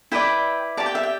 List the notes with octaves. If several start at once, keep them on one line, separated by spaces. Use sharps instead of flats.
E4 B4 D5 G5
G4 D5 A5
G5
E5
G5